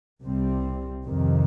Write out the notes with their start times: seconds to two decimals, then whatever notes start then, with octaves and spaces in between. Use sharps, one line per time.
0.22 C2 C3 G3 C4
1.04 F2 C3 D#3